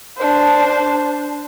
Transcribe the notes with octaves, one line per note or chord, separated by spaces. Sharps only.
D4 C5